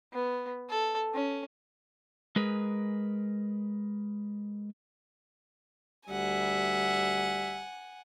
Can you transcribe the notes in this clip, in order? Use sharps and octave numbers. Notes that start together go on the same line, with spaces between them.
B3
A4
C#4
G#3 G#4 A#4 B4
D2 G3 E5 F#5 G#5